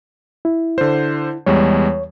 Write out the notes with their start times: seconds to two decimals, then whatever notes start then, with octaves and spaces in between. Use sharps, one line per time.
0.45 E4
0.78 D3 C5
1.46 E2 G3 G#3 C#5